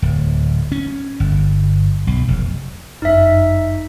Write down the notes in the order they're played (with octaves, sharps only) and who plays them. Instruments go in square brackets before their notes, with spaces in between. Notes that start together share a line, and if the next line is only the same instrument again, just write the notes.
[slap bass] D1
C#4
G1
B1
F1
[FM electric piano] G1 F#2 [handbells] D#4 E5